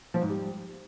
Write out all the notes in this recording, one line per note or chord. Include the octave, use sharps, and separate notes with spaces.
F3
G#2
G3